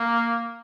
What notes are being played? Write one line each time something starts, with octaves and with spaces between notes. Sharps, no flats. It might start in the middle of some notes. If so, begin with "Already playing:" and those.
Already playing: A#3